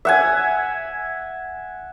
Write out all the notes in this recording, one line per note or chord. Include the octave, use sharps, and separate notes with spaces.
E5 F#5 G#5